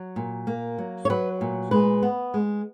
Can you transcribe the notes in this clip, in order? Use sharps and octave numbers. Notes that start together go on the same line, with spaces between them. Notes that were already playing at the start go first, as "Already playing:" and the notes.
Already playing: F#3
A#2
A#3
F#3
C#5
F#3 B4
A#2
G#3 B4
B3
G#3